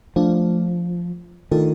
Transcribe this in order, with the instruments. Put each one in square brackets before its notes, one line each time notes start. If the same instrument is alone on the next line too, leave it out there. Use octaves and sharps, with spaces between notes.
[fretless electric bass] F3 [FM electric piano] A3 D4 F4
[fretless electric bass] D#3 [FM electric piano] A3 D4 F4 A4 D#5